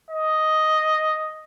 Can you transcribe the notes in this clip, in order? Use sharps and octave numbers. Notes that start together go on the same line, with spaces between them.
D#5